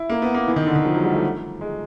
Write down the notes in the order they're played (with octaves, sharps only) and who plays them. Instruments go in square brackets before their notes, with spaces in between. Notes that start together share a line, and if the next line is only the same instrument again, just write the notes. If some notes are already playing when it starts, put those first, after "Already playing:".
Already playing: [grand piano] E4
A#3
B3
A#3
E3
D#3
D3
D#3
F3
F#3
G3
A3
G#3